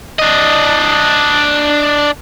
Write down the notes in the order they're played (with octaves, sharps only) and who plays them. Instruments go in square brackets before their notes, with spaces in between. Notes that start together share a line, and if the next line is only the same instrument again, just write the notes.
[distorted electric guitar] D4 D#5